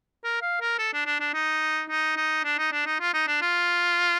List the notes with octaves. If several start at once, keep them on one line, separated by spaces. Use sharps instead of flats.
A#4
F5
A#4
A4
D4
D4
D4
D#4
D#4
D#4
D4
D#4
D4
D#4
F4
D#4
D4
F4